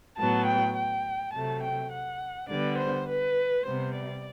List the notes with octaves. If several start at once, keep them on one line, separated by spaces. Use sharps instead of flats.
A2 F#3 B3 A5
G5
G5
C3 F#3 A3 A5
G5
F#5
D3 G3 B3 D5
C5
B4
C3 G3 B3 C5
D5